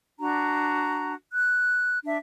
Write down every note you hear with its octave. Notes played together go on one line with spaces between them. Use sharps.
D4 F#4 A#5
F#6
D4 E5